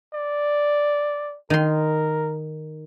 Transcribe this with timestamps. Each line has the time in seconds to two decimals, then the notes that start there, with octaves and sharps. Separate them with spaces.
0.14 D5
1.50 D#3 A#4 C6